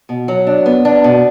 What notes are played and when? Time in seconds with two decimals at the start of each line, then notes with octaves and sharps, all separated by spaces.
0.09 B2
0.28 F#3
0.47 D4
0.66 B3
0.85 D4
1.04 B2